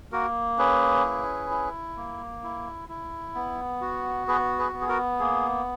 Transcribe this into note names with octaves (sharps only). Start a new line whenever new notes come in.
A#3 F#4 A#4
C#4 G#4 B4
E4
E4
A#3
E4
E4
B3
F#4
B3 G#4 B4
G#4 B4
B3
G#4
F#4 A#4
A#3 G#4